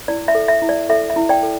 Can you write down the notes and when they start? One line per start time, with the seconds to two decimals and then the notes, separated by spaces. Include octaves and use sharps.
0.08 E4 D5
0.28 E5
0.35 A4
0.48 E5
0.62 E4
0.69 D5
0.89 A4 E5
1.10 E5
1.16 E4
1.29 D5 G5
1.43 A4